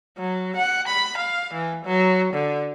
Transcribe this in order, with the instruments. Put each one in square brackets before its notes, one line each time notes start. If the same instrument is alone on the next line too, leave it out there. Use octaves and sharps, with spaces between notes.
[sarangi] F#3
F#5
B5
F5
E3
F#3
D3